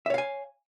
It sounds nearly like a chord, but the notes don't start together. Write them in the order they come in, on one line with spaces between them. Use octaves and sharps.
E5 C#5 F5 G#5